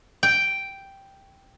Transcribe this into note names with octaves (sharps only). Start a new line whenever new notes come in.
G5